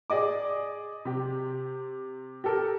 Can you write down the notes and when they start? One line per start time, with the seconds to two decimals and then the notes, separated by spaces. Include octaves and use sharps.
0.10 G#4 D5 D#5 D6
1.05 C3 G4
2.44 G4 A4 A#4